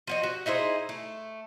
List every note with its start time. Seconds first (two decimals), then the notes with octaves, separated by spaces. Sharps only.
0.07 F3 F#4 D#5
0.23 F#4
0.46 D#4 E4 G#4 C5
0.89 A3